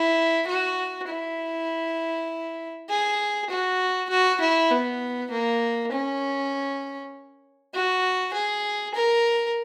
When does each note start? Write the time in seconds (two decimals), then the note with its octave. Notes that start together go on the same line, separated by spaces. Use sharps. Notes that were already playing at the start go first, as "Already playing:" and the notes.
Already playing: E4
0.47 F#4
1.08 E4
2.89 G#4
3.50 F#4
4.10 F#4
4.40 E4
4.71 B3
5.31 A#3
5.92 C#4
7.73 F#4
8.34 G#4
8.95 A#4